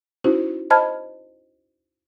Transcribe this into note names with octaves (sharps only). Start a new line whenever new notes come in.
C#4 D#4 E4 F#4 C5
C5 D#5 A5 B5 F6 G#6